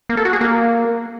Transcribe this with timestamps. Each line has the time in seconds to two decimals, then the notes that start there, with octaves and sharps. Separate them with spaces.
0.09 A#3
0.17 A4
0.25 F#4
0.33 G#4
0.41 A#3